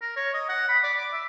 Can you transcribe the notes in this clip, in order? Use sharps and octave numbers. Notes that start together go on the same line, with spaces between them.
A#4
C#5
D#5
F#5
B5
D5
D6
E5